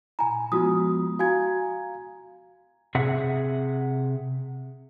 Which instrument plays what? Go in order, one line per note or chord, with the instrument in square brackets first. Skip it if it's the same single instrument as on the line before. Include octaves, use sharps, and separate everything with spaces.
[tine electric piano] A#2 B5 [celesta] G#5 A#5
[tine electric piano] F3 G#3 B3 [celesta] F4 F#4 D#6
[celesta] F#4 G#5 G#6 [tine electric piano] F5 A#5
[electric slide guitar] C3 G#4 E5 F#5